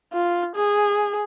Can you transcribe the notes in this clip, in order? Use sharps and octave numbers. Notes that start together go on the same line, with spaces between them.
F4
G#4